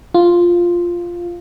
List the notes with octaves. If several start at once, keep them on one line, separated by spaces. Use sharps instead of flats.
F4